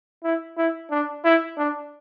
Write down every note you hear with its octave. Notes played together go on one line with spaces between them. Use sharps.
E4
E4
D4
E4
D4